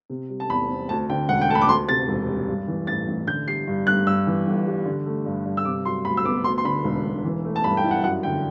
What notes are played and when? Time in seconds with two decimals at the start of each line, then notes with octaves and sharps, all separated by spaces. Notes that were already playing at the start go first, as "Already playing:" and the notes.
0.10 C3
0.29 G3
0.40 A5
0.49 E2 B5
0.70 C4
0.89 D2 A5
1.09 D3 G5
1.28 E1 F#5
1.41 G5
1.49 A3 A5
1.55 B5
1.62 D6
1.68 D2 C6
1.88 C3 A6
2.08 E1
2.28 G3
2.48 G2
2.68 E3
2.87 A1 A6
3.08 A1
3.27 D3 G6
3.47 G3 C7
3.67 G2
3.86 G2 F#6
4.07 G2 E6
4.27 E3
4.47 G1
4.66 G3
4.86 D3
5.06 A3
5.26 G2
5.45 G2
5.57 E6
5.65 C3 D6
5.85 F#3 C6
6.05 D2 B5
6.17 E6
6.25 B3 D6
6.44 D2 C6
6.58 C6
6.64 D3 B5
6.84 E1
7.04 E1
7.25 E3
7.45 A3
7.56 A5
7.64 G2 B5
7.77 G5
7.84 E4
7.91 F#5
8.04 F#2 F#5
8.23 D3 G5